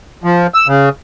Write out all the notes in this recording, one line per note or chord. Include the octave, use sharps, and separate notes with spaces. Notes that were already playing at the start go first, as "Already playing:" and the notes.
F3
E6
C#3